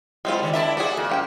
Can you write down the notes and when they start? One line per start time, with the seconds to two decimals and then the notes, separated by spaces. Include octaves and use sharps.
0.25 F#3 G#3 C4 F4 A4 C5
0.41 D3 D#3 D4
0.53 D4 E4 D5 E5 A5
0.77 D4 F#4 G#4 A4 D5
0.97 F2 A#3
1.09 F#2 G4 F#5 G5